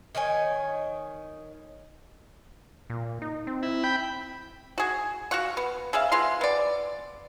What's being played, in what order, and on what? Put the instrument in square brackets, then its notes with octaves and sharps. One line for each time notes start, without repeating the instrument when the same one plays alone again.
[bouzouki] D#3 D#4 C#5 G#5
[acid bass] A#2
D#4
C4
[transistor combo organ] E4
G5 B5
[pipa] F#4 G#4
F#4 F5 F#5 C#6
B3
C#3 G#4 E5 F5
G#3 B3 F4 C6
B3 D5